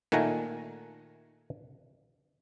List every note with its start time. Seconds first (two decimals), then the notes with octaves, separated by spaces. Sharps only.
0.12 A#2 D#3 A3 F#5 G#5 A#5